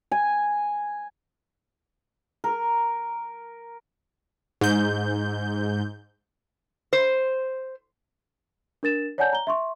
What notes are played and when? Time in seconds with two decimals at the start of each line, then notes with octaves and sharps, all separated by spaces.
0.12 G#5
2.44 A#4
4.61 G#2 G6
6.93 C5
8.83 D4 A#4 A6 E7
9.18 C#5 D5 F#5 G#5 A5 G6
9.33 A#5 G7
9.47 E5 C6 C#6